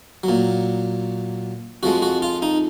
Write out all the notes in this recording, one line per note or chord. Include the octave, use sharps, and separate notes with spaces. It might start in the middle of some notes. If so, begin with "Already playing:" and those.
F#3
A#2
F2 F3 G#3 F#4
F#4
F4
D#4